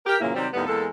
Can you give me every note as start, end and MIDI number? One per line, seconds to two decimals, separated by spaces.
0.06 0.15 67
0.06 0.15 70
0.20 0.34 42
0.20 0.34 46
0.20 0.34 49
0.20 0.34 52
0.20 0.34 58
0.20 0.34 64
0.35 0.47 48
0.35 0.47 51
0.35 0.47 54
0.35 0.47 55
0.35 0.47 60
0.53 0.67 39
0.53 0.67 45
0.53 0.67 55
0.53 0.67 59
0.67 0.86 40
0.67 0.86 56
0.67 0.86 58
0.67 0.86 69